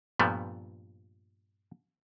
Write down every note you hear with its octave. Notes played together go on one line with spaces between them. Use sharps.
G2 A#2 F3 G3 A3 B3